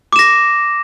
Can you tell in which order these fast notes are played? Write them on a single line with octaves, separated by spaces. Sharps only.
D6 E7 A#6